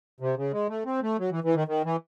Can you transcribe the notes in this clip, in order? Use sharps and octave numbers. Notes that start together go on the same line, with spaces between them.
C3
C#3
G#3
A3
C4
A3
F#3
E3
E3
D#3
D#3
E3